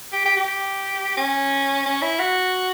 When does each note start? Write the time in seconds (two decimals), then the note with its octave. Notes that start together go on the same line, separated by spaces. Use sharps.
0.13 G4
0.25 G4
0.37 G4
1.17 C#4
1.86 C#4
2.02 E4
2.19 F#4